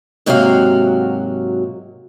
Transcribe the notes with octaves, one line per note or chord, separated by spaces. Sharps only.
G#2 C3 F#3 A#3 F#4 F5